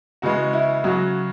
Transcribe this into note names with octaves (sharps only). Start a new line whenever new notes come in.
C#3 E3 G#3 F#4
E4
C#3 F#3 F#4